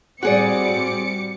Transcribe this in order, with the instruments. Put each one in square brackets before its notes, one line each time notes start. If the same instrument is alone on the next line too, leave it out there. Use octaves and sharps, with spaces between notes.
[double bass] A2 C4 [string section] G3 D6 C#7 [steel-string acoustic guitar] F#4 G#4 D5